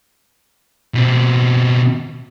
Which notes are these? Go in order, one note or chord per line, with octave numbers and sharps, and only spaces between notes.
B2 C4